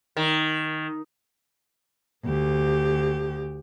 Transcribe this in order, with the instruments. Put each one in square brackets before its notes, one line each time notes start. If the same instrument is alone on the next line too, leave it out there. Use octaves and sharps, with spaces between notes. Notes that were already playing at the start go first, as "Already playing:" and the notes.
[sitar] D#3
[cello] D2 G4